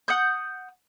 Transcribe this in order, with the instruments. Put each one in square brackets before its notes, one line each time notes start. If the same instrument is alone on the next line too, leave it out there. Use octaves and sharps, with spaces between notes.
[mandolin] F#5 D#6 G6